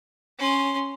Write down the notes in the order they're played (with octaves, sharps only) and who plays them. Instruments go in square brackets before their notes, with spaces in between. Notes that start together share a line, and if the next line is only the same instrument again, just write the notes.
[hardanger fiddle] C#4 C6